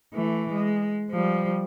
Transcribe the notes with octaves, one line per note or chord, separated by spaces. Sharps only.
E3 A3
G#3
F3 G3